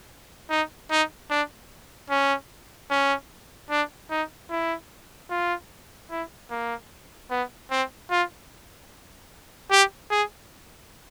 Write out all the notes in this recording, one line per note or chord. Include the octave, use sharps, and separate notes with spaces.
D#4
D#4
D4
C#4
C#4
D4
D#4
E4
F4
E4
A#3
B3
C4
F4
G4
G#4